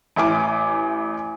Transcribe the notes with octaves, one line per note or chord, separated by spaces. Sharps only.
A1 E4 G#5 D6